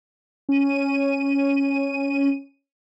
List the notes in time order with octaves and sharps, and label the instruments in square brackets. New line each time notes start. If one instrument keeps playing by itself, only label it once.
[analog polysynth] C#4 D#7